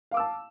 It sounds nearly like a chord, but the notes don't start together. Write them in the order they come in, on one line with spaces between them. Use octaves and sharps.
F5 D6 E6 A5